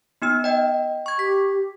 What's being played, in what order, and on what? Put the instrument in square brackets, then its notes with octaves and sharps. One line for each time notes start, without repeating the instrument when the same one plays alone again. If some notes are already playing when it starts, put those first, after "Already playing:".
[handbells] B3 D#4 E6
D#5 G5
C#6 G#6
[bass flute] G4 [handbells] B6